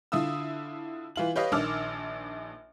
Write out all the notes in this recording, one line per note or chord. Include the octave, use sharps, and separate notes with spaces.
D3 E4 F4 D#6 E6
E3 F4 F#7
G4 B4 C#5 D#5 F5
A#1 D#3 D4 D6 E6 F6